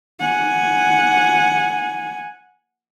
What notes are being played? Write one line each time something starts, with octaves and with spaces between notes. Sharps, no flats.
F#5 G#5